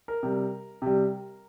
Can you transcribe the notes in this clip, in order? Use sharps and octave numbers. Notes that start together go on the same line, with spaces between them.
A#4
C3 G3
C3 G3